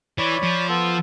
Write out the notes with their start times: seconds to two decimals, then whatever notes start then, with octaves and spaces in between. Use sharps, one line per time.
0.18 E3 C#5 D5 B5
0.43 F3
0.68 B3 F4 A4